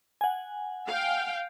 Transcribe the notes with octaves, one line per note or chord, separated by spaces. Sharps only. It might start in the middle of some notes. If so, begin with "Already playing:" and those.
F#5 G#5
F5 G5